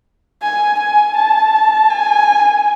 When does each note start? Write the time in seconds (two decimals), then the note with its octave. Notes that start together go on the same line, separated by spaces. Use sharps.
0.42 G#5
0.79 G#5
1.16 A5
1.90 G#5